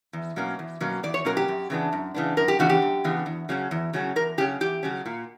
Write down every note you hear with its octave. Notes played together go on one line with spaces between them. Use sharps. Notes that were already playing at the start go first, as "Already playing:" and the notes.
E2
B2 F#3 A#3 C#4
E2
B2 F#3 A#3 C#4
E2 D5
C#5
B2 F#3 A#3 C#4 A#4
G4
F#2
C#3 E3 B3 D4
F#2
C#3 E3 B3 D4
F#2 A#4
G4
C#3 E3 B3 D4 F#4
G4
F#2
C#3 E3 B3 D4
E2
C#3 F#3 C#4
E2
C#3 F#3 C#4
E2 A#4
C#3 F#3 C#4 G4
E2 G4
C#3 F#3 C#4
A#2